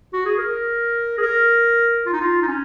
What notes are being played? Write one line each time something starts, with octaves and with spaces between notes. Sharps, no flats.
F#4
G#4
A#4
G#4
A#4
F4
D#4
F4
D#4
C#4